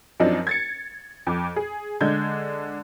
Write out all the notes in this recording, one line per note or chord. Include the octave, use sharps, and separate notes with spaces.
F#2 F3 C4 D4 D#4
G#6 A6 C#7
F2 D6
G#4
D3 G#3 D4 G6 G#6